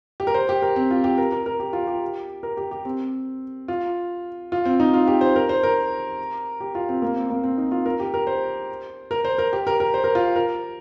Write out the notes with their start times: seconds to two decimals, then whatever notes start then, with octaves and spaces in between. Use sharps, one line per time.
0.20 G4
0.27 A#4
0.34 C5
0.49 G4
0.62 A#4
0.76 C4
0.91 F4
1.04 G4
1.18 A#4
1.32 A#4
1.46 A#4
1.60 G4
1.73 F4
1.87 G4
2.43 A#4
2.57 G4
2.71 G4
2.85 C4
3.68 F4
4.52 F4
4.65 C4
4.80 D#4
4.94 F4
5.07 G4
5.21 C5
5.36 A#4
5.49 C5
5.63 A#4
6.61 G4
6.75 F4
6.89 C4
7.02 A#3
7.16 C4
7.30 A#3
7.44 C4
7.58 D#4
7.72 F4
7.86 A#4
8.00 G4
8.14 A#4
8.27 C5
9.11 A#4
9.25 C5
9.38 A#4
9.53 G4
9.67 A#4
9.80 A#4
9.94 C5
10.04 A#4
10.15 F4
10.36 A#4